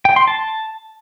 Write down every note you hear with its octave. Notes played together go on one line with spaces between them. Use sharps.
G5
C6
A5